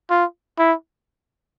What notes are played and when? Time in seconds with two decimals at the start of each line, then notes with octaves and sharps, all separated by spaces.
0.10 F4
0.58 E4